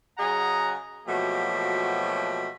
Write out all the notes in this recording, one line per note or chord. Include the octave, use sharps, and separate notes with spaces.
C#3 F#3 G#4 D#5 F#5 A#5
B2 F3 F#3 A3 A#3 G4